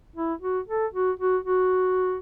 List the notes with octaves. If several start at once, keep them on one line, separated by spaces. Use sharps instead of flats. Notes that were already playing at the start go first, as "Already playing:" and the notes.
E4
F#4
A4
F#4
F#4
F#4